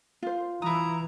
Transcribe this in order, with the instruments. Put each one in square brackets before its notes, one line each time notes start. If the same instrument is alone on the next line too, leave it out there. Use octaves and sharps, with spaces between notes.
[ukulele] F4 C5
[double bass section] E3 [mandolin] E4 D#6 [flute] A#5